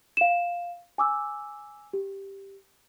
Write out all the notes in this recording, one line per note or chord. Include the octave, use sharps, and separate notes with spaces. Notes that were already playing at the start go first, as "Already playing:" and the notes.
F5 E7
G#5 D6 E6
G4